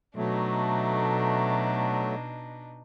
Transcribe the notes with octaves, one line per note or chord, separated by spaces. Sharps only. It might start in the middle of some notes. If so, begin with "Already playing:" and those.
B2 F#3 A3 D4 D#4